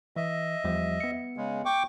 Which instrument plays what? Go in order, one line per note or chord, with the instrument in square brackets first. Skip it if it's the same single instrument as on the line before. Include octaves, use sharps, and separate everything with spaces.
[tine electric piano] E3 [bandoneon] D#5 E5
[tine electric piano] E2 F3 G3
B3 C#7
[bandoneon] C#3 G#3
G5 C#6 D6